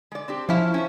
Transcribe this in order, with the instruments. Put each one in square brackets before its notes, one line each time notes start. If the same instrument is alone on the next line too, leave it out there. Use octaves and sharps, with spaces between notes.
[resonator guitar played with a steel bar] G#3 D5
C4 D4 G4
[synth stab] F3 E4 [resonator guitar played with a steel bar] C#4 F5 A5
[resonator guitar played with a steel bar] C#4 C5 E5